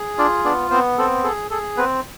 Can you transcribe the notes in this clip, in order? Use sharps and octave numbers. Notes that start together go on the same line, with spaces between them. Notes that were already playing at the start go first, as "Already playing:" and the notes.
Already playing: G#4
D4 F4 D5
B3 D4 D5
B3 C4 C5
C4 A4
G#4 A4
G#4 A4
B3 C4 B4